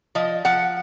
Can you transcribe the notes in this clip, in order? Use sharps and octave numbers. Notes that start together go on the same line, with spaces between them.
F3 D#5
F3 F#5